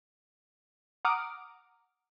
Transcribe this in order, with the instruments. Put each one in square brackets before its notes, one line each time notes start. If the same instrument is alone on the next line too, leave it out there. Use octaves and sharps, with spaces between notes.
[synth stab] F#5 A#5 D6 D#6 F6 D7